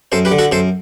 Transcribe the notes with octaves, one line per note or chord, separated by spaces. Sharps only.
F#2 A4 C5
G4 B4
D3
F#4 A4
F#2 A4 C5